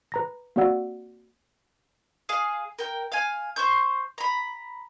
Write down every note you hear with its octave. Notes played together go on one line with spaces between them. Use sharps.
B4 A#5 A#6
A#3 C4 F#4 D5 F#5 E6
G#4 F5
A#4 G5
F5 G#5
C5 C#6 G6
A#5 B5